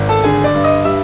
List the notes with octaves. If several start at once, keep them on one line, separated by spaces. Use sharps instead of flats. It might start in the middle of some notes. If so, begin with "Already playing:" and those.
Already playing: G#1
A4 A5
D3 G#4 G#5
D5 D6
G2
D#5 D#6
G3 E5 E6